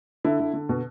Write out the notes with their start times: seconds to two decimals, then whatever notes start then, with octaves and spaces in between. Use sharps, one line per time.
0.24 D3 E4
0.40 D3
0.54 D3
0.69 B2